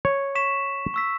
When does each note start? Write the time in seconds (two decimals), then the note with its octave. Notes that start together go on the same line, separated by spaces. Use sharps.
0.05 C#5
0.35 C#6 B6 E7
0.94 C#6 E6 B6